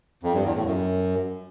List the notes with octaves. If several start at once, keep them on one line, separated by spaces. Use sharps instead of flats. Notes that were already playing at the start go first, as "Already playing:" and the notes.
F2
G2
E2
A2
F#2